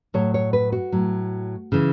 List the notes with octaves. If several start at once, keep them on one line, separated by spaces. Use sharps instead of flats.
A2 F#3 C#5
C#5
B4
F#4
A2 F#3
C#3 E3